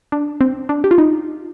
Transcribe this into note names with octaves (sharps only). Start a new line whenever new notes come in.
D4
C4
D4
G4
F4
D#4